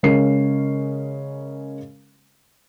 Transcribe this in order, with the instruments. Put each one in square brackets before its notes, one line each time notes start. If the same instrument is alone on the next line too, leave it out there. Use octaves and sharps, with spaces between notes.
[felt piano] C#3 G#3 C#4 A#4 C7